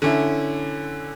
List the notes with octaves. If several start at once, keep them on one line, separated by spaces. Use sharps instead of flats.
D3 C#4 E4